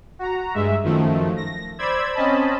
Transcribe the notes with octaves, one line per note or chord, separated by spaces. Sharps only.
F#4 A#5
G2 G#3 E5
F#2 D#3 F3 A3
A#6
C5 D5 B5 E6 G#6
C4 C#4 D#5 A5 B5